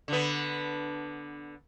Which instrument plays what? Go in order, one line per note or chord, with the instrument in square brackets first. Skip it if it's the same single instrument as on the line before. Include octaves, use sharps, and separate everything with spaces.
[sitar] D3 B3